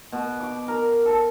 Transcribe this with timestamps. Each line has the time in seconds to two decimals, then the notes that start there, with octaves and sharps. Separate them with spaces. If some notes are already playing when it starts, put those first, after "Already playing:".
0.12 B2
0.40 D6
0.68 A#4
1.05 A4